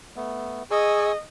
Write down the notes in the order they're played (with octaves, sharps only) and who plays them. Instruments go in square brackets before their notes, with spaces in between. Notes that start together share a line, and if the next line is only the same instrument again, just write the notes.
[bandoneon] A3 B3
[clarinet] G#4 [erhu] D#5 [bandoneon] G#5 C#6 E6